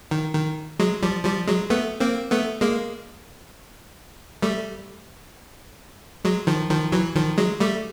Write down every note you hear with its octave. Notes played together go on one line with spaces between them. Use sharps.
D#3
D#3
F#3 G#3
F3 G3
F3 G3
F#3 G#3
A3 B3
A#3 C4
A3 B3
G#3 A#3
G3 A3
F#3 G#3
D#3 F3
D#3 F3
E3 F#3
D#3 F3
F#3 G#3
G3 A3